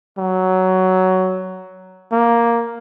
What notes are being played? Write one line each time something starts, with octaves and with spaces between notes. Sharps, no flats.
F#3
A#3